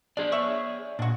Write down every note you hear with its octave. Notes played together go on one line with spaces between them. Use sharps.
D4 G#4 D5
C#5 E5 C#6
A#2 D4 F#4